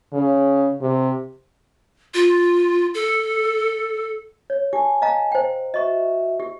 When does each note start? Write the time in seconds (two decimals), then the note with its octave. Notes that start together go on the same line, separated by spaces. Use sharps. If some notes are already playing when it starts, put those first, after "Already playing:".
0.13 C#3
0.82 C3
2.14 F4
2.94 A4
4.50 C#5
4.73 G4 G#5 A5
5.02 D#5 F5 A#5
5.32 C5 G5
5.74 F#4 D#5 E5 C#6
6.40 G4